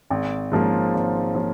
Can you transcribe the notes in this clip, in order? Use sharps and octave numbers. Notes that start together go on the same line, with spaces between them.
G#1
G#2 F3 A#3 C#4
G#1
F3 A#3 C#4